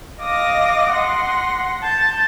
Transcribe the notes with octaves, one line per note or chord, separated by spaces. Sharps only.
D#5 F5 D6 D#6 A#6
F#5 C6 A#6
A5 G6 A6